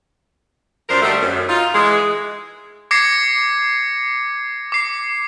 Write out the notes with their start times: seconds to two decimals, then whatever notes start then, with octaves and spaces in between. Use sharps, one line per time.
0.89 F#2 F3 D4 A#4 C5
1.02 D3 D#3 G3 A3
1.21 F#2
1.49 D#4 F4
1.74 E3 G#3
2.91 D6 G#6 A#6 C7 C#7
4.72 D6 C7